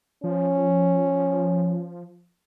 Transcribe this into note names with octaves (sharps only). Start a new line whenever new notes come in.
F3 C#4